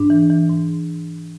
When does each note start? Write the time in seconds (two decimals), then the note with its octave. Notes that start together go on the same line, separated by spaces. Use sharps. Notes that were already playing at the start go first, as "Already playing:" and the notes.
Already playing: G#2 D4
0.10 E3
0.30 E3
0.49 G#2